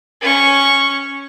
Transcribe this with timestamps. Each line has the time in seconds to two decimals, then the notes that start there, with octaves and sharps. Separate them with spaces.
0.21 C#4 C#6